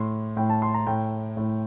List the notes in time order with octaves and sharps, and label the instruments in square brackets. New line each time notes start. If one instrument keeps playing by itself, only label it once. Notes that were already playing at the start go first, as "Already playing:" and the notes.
Already playing: [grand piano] A2 C6
A2 G5
A5
C6
A#5
A2 G5
A2